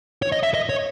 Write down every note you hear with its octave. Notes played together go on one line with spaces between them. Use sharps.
C#5
D#5
E5
D#5
C#5